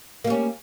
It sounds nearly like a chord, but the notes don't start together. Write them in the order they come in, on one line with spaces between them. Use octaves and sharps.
A#3 G3 C#4